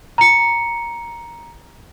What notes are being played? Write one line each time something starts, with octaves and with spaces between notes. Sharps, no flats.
A#5 C#7